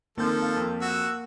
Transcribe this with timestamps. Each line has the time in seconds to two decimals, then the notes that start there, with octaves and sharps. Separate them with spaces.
0.18 D#3 F3 A#3 C4 A4 G6
0.42 F5
0.57 F2
0.81 F#4 E6